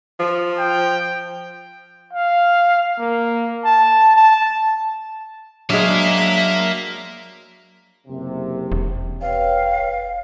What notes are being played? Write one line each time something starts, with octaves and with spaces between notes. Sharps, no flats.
F3
G5
F5
A#3
A5
A5
F#3 G#3 A#3 D4 E5 F5
F#1 C3
E1
B4 C#5 F5 G5